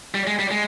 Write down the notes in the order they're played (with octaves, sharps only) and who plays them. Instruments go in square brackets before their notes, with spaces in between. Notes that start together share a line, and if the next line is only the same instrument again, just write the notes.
[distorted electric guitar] G3
G#3
G3
G#3